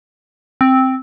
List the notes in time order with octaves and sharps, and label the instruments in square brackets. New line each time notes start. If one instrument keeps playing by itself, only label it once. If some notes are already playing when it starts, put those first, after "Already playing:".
[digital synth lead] C4